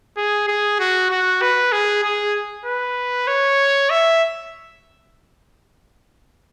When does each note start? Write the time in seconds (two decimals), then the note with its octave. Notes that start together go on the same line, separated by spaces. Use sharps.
0.17 G#4
0.48 G#4
0.80 F#4
1.11 F#4
1.42 B4
1.72 G#4
2.04 G#4
2.65 B4
3.28 C#5
3.90 E5